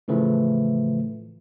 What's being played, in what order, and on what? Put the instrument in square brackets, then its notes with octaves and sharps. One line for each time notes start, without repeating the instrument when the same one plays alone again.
[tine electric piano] A2 C#3 E3 F3 A3